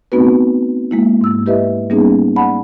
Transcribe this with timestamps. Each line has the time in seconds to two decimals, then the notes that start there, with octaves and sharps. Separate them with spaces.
0.12 A3 B3 C4 D#4 F#4 B4
0.91 G#3 A#3 E4
1.21 G#2 E6
1.46 E4 G4 B4 D#5 E5
1.90 G3 A#3 B3 C#4 D#4 G#4
2.36 D5 F#5 A5 B5